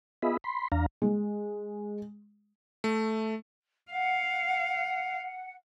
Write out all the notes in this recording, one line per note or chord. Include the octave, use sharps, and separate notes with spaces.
B3 F4 G#4 D#5 E5 B5
B5 C6
E2 D4 F5 A#5
G#3
A3
F5 F#5